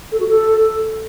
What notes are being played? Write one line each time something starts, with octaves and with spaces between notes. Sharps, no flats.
A4
F#4
A4